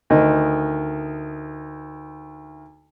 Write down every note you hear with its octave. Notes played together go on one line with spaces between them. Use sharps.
D2 D#3 D#5